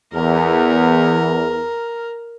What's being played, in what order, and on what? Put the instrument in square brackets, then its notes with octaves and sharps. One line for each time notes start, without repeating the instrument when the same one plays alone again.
[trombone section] E2 [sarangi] A#4